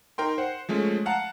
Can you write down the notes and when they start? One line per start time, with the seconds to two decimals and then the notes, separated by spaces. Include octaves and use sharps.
0.18 D#4 A#4 G5 C6
0.38 C5 F#5
0.69 F3 G#3 A3 C#4
1.06 F5 F#5 A5 A#5